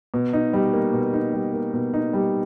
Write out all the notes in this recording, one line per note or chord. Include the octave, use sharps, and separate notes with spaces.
B2
D#4
G3
A#3
B2
D#4
G3
A#3
B2
D#4
G3